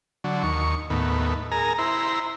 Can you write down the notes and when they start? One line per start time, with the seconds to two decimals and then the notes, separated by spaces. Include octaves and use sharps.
0.24 D3 F#3
0.43 D#2 C#6
0.90 D#2 A2 B3
1.51 G#4 A#4 A#5
1.78 E4 C5 A#5